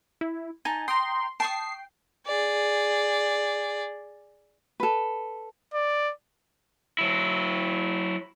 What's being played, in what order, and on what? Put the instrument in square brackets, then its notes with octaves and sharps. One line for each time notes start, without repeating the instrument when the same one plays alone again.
[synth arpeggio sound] E4
[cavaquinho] D#4 A5 [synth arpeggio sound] G#5
[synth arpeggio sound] G5 A#5 [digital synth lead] C6 [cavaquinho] D#6
[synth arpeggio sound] G5 [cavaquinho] A5 C#6 D#6 [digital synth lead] C7
[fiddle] G#4 D5
[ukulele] A4 B4
[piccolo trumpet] D5
[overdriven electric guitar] F#3 E4